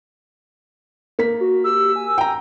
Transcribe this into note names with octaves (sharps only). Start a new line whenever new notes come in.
A#3 B6
F#4
G4 E6
G#5
G5 A#5